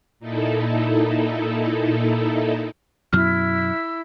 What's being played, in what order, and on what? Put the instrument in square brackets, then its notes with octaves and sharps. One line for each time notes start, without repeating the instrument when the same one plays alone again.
[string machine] A#2 D#4 E4 A4
[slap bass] F#2 B2 F#3 [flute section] E4 E6 [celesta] F6